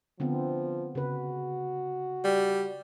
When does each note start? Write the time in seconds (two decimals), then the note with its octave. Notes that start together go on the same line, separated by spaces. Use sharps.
0.20 D3 F3 B3 C4
0.95 C#3 F#4 B4
2.25 G3